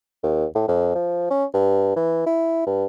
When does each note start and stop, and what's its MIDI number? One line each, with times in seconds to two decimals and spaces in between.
0.23 0.45 39
0.55 0.66 45
0.68 0.90 41
0.95 1.29 53
1.30 1.45 61
1.54 1.92 43
1.96 2.22 52
2.26 2.66 64
2.66 2.86 43